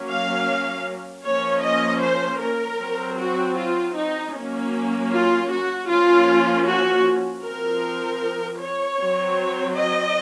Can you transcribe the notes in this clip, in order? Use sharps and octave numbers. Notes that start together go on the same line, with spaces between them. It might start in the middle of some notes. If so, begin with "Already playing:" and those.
Already playing: F#3 A#3 C#4
F5
F3 A#3 C#4 C#5
D#5
C5
A#4
F#3 C4
F#4
F4
D#4
F#3 A#3 C#4
F4
F#4
F3 A#3 C#4 F4
F#4
F3 C4 A#4
C#5
F#3 C4
D#5